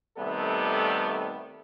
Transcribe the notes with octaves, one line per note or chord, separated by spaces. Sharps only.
C3 D#3 G3 A3 B3 A4